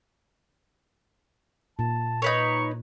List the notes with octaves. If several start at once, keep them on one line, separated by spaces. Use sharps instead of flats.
A#2 A5
D#4 B4 C#5 C#6